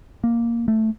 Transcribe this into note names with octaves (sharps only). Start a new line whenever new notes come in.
A#3
A3